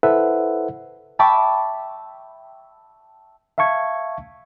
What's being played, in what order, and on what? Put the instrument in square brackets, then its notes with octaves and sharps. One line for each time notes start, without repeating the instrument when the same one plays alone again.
[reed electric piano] E4 A4 B4 C5 E5 F#5
[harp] E5 G5 A5 B5 C#6 D6
[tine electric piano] E5 F5 A5 C#6 G#6